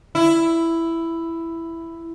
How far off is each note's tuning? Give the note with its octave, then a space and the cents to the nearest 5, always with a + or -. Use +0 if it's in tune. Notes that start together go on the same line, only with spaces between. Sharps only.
E4 +5